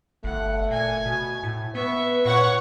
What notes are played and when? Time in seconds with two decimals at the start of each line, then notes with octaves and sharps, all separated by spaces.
0.24 G1 A3 F#5
0.71 A#2 G#5
1.06 B2
1.43 A2
1.75 B3 B4 E5 C#6
2.25 A#2 C#5 F#5 C#6